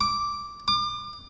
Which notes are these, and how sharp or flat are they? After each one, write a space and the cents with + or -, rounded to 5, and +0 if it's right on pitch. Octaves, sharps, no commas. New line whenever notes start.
D6 -5
D6 +35